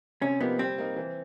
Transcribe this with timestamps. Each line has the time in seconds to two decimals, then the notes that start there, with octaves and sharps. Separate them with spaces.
0.21 C3 C#4
0.40 F3 A#3 B3 D#4 G4
0.59 G3 C4
0.78 A#3 D#4
0.96 E3